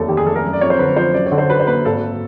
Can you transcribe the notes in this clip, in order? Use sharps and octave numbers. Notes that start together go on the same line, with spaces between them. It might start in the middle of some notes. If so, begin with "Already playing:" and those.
Already playing: F1 D#2 A4
D#3 G4
G#4
F1 A4
A#4
F#1
D5
F2 C#5
C5
D3 B4
F3 C5
F#2 D5
C#5
D3
C5
F#3 B4
C5
A#3 B4
G#1 A4